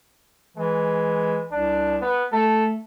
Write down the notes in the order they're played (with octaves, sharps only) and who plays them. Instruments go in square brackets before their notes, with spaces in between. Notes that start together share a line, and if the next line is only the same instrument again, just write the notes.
[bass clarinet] E3 [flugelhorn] G#3
[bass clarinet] C2 [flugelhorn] D4
[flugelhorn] B3
[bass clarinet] A3 [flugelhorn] A4